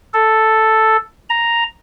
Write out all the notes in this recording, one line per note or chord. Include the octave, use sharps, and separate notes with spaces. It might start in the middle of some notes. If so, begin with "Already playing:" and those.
A4
A#5